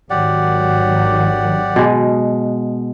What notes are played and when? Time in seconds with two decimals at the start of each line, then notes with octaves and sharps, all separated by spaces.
0.10 G#1 D#3 F#3 G4 D5 F#5
1.76 B2 G#3